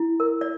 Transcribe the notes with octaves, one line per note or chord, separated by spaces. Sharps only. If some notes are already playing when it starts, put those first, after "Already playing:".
Already playing: E4
A#4
D5